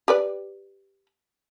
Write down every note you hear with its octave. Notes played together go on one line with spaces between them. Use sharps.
G4 B4 D5